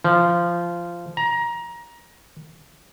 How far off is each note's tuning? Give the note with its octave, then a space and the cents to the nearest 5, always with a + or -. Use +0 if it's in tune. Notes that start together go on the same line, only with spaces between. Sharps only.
F3 -15
A#5 +20